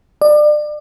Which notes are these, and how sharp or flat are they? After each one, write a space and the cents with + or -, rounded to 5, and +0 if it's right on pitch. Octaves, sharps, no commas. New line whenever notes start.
D5 +30